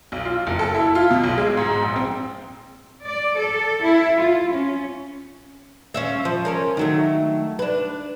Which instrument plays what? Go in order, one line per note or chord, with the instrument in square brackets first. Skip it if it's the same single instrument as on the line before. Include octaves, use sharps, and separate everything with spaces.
[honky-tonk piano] B1
F4
F#1
A4
E4
F4
B2
B1
G#3
G#2
A#1
C4
[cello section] D5
A4
E4
F4
C#4
[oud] C#4 F4 E5
F3
C#4 A#4 C#5
D#3 F#3 A3
D4 B4